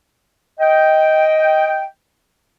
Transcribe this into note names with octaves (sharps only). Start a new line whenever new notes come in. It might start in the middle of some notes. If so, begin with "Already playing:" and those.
D#5 G5